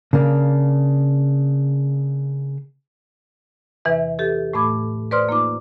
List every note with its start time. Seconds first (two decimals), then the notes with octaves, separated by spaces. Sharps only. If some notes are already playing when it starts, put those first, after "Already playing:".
0.13 C#3 A#3 D4
3.85 E2 C3 E3 B4 E5
4.19 G4 A4
4.54 A2 A3 B5 D6 G#6
5.11 B4 C5 D5 C6 D#6 F6
5.29 A#3 D#4 F4 D6